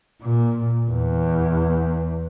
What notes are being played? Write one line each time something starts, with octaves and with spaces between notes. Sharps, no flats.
A#2
E2